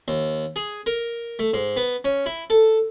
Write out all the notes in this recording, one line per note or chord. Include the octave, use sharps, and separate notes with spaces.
D#2
G#4
A#4
A3
G#2
B3
C#4
E4
A4